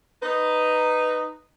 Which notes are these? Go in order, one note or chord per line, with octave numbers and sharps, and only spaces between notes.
D#4 B4